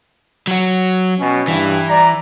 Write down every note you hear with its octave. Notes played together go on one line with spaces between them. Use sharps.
F#3 F#4
B2 C#4
G2 E3
D5 A#5